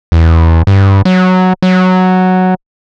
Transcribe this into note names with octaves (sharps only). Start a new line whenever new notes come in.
E2
G2
F#3
F#3